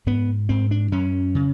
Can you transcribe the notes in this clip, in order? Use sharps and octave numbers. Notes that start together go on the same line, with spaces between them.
G#2 B3
G#2 C4
D4
F#2 C#4
C#3